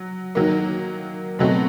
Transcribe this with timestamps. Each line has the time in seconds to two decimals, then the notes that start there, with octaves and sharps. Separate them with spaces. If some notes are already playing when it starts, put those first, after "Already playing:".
Already playing: F#3
0.35 D#3 F#3 A#3
1.39 B2 F#3 A3 C4